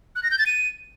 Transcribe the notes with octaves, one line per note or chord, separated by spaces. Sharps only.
F#6
A#6
G6
A6
D#7